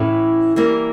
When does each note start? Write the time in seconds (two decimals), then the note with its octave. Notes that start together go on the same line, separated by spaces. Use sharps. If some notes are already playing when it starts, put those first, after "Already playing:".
Already playing: A2 E3 A3 C#4
0.56 E3 G3 A#3